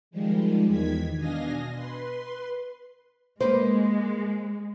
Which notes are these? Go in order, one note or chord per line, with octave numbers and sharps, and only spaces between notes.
D#3 F3 G3 G#3
E2 D#3 G#6 B6
B2 D4 D#5 F5 G#5 A#6
B4 C6
G#3 A#3 B4 C5